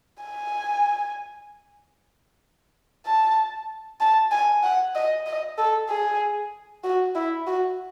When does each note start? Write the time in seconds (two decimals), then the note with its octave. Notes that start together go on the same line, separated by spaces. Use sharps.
0.24 G#5
3.06 A5
4.01 A5
4.32 G#5
4.63 F#5
4.95 D#5
5.27 D#5
5.58 A4
5.89 G#4
6.84 F#4
7.15 E4
7.47 F#4